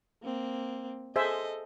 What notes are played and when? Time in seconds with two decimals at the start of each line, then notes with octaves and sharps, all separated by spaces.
0.23 A#3 C4
1.16 G#4 A4 C5 D#5 E5